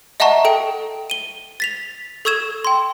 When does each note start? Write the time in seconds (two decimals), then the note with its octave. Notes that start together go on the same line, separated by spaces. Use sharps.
0.20 D#5 E5 F#5 A5 A#5 C#6
0.45 A4 G5 D7
1.10 D#7 G7
1.60 A6 B6 F7
2.25 A4 C#6 E6 G#6 E7
2.65 G5 C6